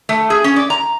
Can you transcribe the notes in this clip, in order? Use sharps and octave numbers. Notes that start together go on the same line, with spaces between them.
A3
G#4
C#4
D5
A#5